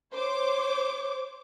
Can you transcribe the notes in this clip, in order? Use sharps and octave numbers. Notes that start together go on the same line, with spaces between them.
C5 C#5 D6